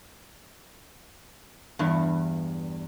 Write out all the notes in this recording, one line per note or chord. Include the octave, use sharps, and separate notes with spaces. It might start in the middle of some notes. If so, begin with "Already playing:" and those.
E2 G2